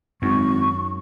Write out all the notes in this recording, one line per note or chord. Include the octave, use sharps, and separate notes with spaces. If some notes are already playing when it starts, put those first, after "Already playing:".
G#1 F#2 C#6